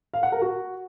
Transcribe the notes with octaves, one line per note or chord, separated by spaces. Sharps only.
F5
F#5
A#4
F#4